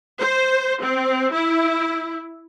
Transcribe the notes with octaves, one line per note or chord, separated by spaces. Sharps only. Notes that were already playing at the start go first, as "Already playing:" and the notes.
C5
C4
E4